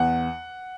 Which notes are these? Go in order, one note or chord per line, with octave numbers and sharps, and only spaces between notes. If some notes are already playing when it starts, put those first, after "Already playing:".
Already playing: E2 F#5